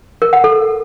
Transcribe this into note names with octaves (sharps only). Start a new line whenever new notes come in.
A#4
F#5
A4